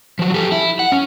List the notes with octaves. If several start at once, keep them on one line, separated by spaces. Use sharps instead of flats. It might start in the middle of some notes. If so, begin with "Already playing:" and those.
F3 F#3
G4 A4
E4
F#5
C#4